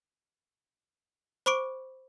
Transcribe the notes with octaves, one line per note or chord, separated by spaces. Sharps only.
C5 B5 C#6 D6 D7